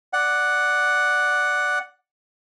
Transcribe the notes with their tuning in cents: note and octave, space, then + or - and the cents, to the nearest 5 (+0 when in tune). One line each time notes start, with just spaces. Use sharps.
D5 +0 F#5 +0